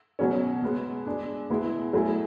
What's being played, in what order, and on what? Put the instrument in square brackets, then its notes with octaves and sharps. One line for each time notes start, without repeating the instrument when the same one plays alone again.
[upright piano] B2 F#3 C#4
B2 G#3 B3
G#3 D4 G#4
B2 G#3 B3 E4
F#3 A3 E4 G#4